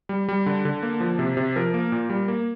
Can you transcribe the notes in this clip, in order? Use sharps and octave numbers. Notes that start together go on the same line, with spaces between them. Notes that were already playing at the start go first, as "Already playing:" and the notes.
G3
G3
D3
D3
A#3
F3
C3
C3
F3 A#4
A#3
A#2
G3
A#3